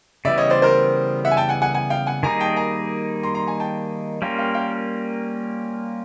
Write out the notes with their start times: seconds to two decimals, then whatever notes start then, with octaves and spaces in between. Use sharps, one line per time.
0.25 C#3 E3 G3 B3 D5 E5
0.38 C#5 D#5
0.50 C5 D5
0.62 A#4 C5
1.25 E5 F#5
1.31 G#5
1.37 G5 A5
1.49 F#5 G#5
1.62 F#5 G#5
1.74 F#5 G#5
1.90 F5 G5
2.07 F#5 G#5
2.23 D#3 G3 A#3 D#4 G#4 G#5 A#5
2.40 G5 A5
2.56 G#5 A#5
3.23 A#5 C6
3.35 A#5 C6
3.47 G#5 A#5
3.60 G5 A5
4.22 G3 A#3 C#4 F4 A#4 F5 G5
4.38 F5 G5
4.54 F5 G5